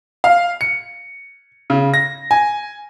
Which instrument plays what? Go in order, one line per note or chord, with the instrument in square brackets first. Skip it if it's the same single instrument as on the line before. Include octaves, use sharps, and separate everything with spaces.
[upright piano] F5
C#7
C#3
A#6
G#5